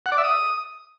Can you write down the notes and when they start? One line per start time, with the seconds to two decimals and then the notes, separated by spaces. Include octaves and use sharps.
0.06 F#5
0.12 D5
0.18 E5
0.24 D#6